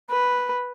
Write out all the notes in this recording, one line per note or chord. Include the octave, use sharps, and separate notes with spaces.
B4